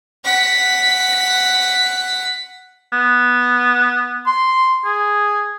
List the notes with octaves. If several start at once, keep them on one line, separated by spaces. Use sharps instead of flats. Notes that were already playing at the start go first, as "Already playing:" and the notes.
F#5 B6
B3
C6
G#4